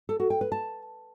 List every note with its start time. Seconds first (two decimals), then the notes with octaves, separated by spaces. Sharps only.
0.09 A4
0.20 F#4
0.30 G5
0.41 B4
0.52 A5